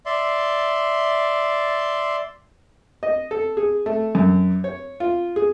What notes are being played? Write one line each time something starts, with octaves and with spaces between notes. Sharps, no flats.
D5 E5 C6
D#5
A4
G#4
A3
F#2
C#5
F4
G#4